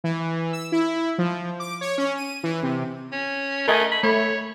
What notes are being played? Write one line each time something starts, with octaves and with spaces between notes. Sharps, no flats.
E3
E6
E4
F3
D6
C#5
C#4
D#7
E3
C3
C#4
A3 A#4 D#5 G#5
B5
A3 C#5 B5